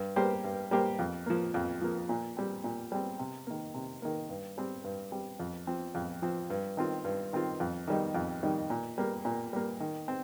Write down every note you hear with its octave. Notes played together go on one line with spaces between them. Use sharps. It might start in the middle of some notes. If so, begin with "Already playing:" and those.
Already playing: G2
G3 A#3 G4 C5
G2
G3 A#3 G4 C5
F2
F3 A#3
F2
F3 A#3
A#2
G3 C4
A#2
G3 C4
C3
D#3 A#3
C3
D#3 A#3
G2
G3 C4
G2
G3 C4
F2
F3 C4
F2
F3 C4
G2
D#3 C4 F4
G2
D#3 C4 F4
F2
D#3 G3 D#4
F2
D#3 G3 D#4
A#2
G3 A#3
A#2
G3 A#3
D#3
C4